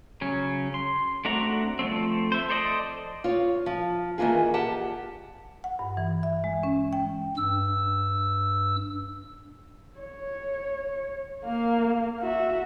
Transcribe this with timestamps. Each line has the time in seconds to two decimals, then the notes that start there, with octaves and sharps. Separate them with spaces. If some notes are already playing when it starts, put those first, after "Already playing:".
0.21 C#3 F#3 C#4
0.74 C6
1.25 A3 C4 D4 F#4 A#5
1.79 F3 F#3 A3 C4
2.32 C5 E5
2.50 A4 C5 D5 D#5
3.24 F4 C#5
3.66 F3
4.18 D#3 E3 A#3 F4 G#4
4.54 G4 F#5 A5
5.64 F#5
5.79 G2
5.97 E3
6.23 E5
6.44 G#3
6.63 C#4
6.93 G5
7.37 G2 E6
9.99 C#5
11.45 A#3 F5
12.21 F#4 E5